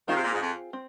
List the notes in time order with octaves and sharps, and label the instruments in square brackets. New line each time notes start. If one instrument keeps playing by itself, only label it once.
[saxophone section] D#3 [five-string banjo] C4 F4 G#4
[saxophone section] C3
A#2
G#2
F2
[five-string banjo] C4